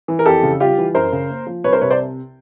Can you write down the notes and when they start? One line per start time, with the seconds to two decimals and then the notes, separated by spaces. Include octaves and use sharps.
0.08 E3
0.19 A#4
0.26 F2 G4 A4
0.43 C#3
0.60 G3 F4 G4
0.78 E3
0.94 F#2 A#4 C5
1.12 C#3
1.30 A#3
1.47 F3
1.64 C2 B4 C#5
1.73 A#4 C5
1.81 C3 B4 C#5
1.90 C5 D5